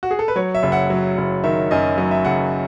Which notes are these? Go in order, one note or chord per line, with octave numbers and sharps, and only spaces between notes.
F#4
G#4
A4
B4
F#3 C#5
E5
F#1
F#5
F#3
F#1
D#3 E5
F#2 D#5
F#3 D#5
E5
F#1 F#5